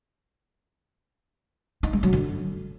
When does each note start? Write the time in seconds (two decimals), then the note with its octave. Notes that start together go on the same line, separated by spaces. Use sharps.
1.83 D#4
1.93 G#3
2.03 F#3
2.13 D3